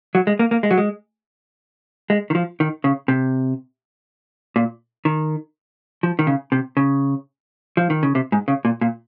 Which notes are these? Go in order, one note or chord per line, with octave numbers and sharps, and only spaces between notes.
F#3
G#3
A#3
A#3
G#3
F#3
G#3
G#3
D#3
F3
D#3
C#3
C3
A#2
D#3
F3
D#3
C#3
C3
C#3
F3
D#3
C#3
C3
G#2
C#3
A#2
A#2